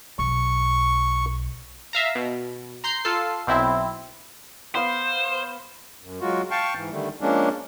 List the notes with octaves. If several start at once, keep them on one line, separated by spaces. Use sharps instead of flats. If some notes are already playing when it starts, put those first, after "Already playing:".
B1 C#6
E5 F5 A#5
B2
A#5 C6 G6 C7
F4 A4 C7
B1 C4 E4
B3 C5 F5
F#2
F#3 G#3 F4 F#4
F5 G5 A5 C#6
G#2 E3
D3 D#3 G3 A3
F3 G#3 A#3 C#4 D4